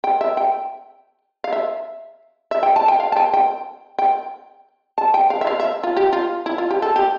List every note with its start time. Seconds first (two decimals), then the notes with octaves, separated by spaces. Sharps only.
0.04 G5
0.21 E5
0.37 G5
1.44 F5
1.53 E5
2.51 E5
2.63 G5
2.76 A5
2.88 G5
3.00 F5
3.12 A5
3.16 G5
3.33 G5
3.99 G5
4.98 A5
5.14 G5
5.30 F5
5.41 E5
5.47 F5
5.60 E5
5.83 F4
5.96 G4
6.13 F4
6.46 E4
6.58 F4
6.71 G4
6.82 A4
6.96 G4